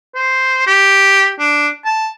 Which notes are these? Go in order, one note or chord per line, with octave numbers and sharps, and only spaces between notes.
C5
G4
D4
A5